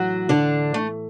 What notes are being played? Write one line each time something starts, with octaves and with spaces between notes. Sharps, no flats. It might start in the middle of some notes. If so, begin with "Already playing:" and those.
Already playing: A2 E3 F#3 F#4
D3 D4
A3